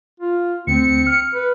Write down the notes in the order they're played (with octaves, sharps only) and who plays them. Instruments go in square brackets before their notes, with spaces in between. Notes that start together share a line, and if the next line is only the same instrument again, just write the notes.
[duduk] F4
[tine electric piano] D2 [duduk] C4 [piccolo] C#7
[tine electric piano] F6
[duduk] B4